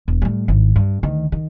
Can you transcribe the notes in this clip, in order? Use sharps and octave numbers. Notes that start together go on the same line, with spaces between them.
E1
A2 G3
G#1 A2
G2
D2 D#3
D#3